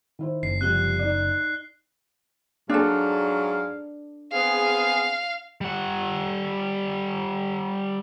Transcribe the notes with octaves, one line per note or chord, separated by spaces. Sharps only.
D#3 E4 C5
F#1 C7
C3 F3 G3 F#6 G7
D#4 D5
G#2 F#3 D4 A4 F5
B3 C4 G#4 F5
G3 F#5